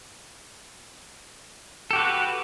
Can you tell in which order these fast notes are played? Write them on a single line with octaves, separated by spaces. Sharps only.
A4 G4 F#4 B4